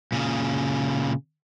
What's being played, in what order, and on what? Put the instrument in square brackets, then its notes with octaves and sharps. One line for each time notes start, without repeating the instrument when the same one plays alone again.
[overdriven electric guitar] A#2 C#3